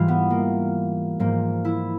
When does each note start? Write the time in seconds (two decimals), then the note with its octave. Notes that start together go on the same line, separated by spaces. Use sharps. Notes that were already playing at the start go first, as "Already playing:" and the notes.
Already playing: G#2 E3 G3 F4
0.08 B3
0.30 A#3
1.19 G#2 F3 A#3
1.65 E4